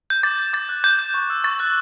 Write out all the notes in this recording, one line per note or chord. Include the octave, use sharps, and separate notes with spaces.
G6
D6 A6
G6
D6 A6
F#6
D6 G6
G6
C#6
E6 G6
C#6 A6
F#6 A6